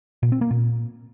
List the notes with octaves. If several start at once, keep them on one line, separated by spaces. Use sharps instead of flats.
A#2
C4
A#3
A#2